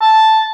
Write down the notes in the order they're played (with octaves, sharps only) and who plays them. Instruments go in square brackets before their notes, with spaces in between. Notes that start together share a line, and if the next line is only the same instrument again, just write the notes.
[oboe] A5